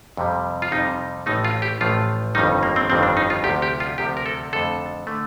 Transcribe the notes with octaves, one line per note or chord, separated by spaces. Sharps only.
F2 C3 G3
F4
F2 C3 G3 D#4
A1 A2 F3 A3 D#4
F4
G4
A1 A2 F3 A3 F4
G1 F2 D#3 G3 D#4
A#3
C4
G1 F2 D#3 G3 C4
D4
D#4
F4
D2 C3 F3 G4
G4
F4
D2 C3 F3 G4
A#4
A4
F2 D3 A3 A4
D3 A3